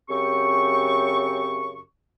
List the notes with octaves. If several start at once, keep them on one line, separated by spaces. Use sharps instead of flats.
F#2 C#3 C4 G4 C#6